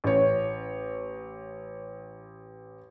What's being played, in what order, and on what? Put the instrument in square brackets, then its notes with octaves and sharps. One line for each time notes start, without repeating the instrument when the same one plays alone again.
[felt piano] A1 C#5